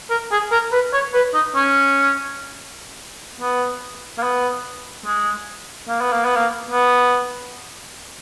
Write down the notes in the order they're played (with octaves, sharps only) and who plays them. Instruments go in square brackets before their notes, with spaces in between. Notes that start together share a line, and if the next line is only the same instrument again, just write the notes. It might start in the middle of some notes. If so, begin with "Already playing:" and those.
[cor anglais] A#4
G#4
A#4
B4
C#5
B4
D#4
C#4
B3
A#3
B3
G#3
A#3
B3
A#3
B3
A#3
B3